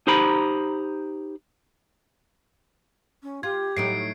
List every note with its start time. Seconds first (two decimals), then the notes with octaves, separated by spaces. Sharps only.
0.07 D#4 G4 C5 A#5 B5
3.23 C#4
3.43 F4 G4 G#6
3.77 A2 F#3 D#4 C7 D7